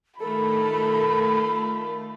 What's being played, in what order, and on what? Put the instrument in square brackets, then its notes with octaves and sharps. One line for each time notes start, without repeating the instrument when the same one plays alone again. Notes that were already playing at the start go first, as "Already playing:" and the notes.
[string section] D#3 A3 F4 [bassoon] A4 [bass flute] A#4 [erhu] B5